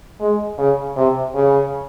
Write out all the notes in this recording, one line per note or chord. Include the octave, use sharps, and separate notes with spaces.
G#3
C#3
C3
C#3